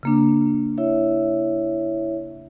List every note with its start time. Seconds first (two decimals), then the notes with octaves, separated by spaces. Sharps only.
0.03 C#3 A#3 D4
0.78 E4 C#5 E5